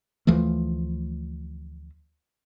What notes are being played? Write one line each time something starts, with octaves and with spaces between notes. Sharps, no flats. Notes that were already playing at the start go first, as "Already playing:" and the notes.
D2 E3 F3 A3